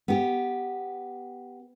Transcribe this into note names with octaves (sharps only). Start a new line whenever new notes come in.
B3 G4